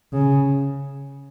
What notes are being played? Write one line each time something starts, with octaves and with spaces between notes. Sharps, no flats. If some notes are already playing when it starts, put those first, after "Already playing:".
C#3